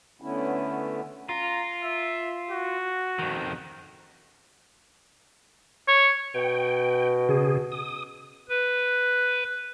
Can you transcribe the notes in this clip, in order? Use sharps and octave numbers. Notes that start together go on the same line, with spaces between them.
D3 A3 B3 C#4 E4
F4 A#5
E5
F#4
F2 D#3
C#5
B2 G5
C#3 G#4
D#6
B4